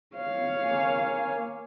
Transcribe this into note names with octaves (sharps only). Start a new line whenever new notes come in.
C#5 F5
A#3 G#5